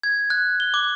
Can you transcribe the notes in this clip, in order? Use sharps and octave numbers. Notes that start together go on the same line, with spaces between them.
G#6
F#6
G7
D6